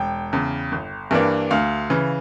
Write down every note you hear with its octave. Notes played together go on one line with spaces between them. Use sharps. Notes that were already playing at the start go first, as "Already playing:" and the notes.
Already playing: E1 G5
E2 C#3
G1
G2 E3 A#3 D4
D2 F5
C#3 E3